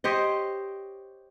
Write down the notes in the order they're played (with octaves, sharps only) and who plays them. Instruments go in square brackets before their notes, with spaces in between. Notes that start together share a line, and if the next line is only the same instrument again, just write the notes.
[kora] G4 C5 C#5 D#5